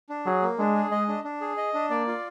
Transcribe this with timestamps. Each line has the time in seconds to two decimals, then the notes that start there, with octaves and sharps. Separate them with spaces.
0.10 D4
0.26 F#3 G#4
0.42 A#3
0.59 G#3 D4
0.75 G#4
0.91 G#3 D#5
1.08 D4
1.24 D4
1.41 G#4
1.57 D#5
1.74 D4
1.90 A#3 D5
2.07 F4